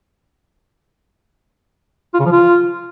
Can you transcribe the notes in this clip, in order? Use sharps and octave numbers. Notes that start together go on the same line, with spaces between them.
F4
C#3
F3
F4